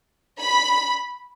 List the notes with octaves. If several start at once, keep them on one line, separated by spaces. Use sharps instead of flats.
B5